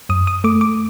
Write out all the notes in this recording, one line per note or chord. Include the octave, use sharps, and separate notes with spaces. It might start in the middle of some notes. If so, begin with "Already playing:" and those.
F#2 D#6
D#6
A3 D6
D6